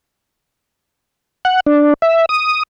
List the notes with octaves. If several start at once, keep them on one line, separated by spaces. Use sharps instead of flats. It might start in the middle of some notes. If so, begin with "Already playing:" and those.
F#5
D4
E5
D#6